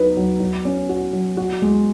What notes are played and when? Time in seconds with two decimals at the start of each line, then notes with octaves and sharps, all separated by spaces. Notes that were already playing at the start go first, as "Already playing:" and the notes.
Already playing: F#3 D#4 B4
0.17 F#3
0.40 F#3
0.65 C#4
0.89 F#4
1.13 F#3
1.37 F#4
1.62 G#3